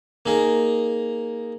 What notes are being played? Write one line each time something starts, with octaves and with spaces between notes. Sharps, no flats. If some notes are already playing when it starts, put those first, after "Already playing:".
A#3 D#4 G#4 A#4